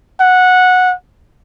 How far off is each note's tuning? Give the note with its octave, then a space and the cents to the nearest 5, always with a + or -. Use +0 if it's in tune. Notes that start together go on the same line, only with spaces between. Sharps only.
F#5 -15